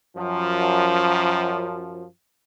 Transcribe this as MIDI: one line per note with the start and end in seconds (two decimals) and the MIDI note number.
0.16 2.05 42
0.16 2.05 53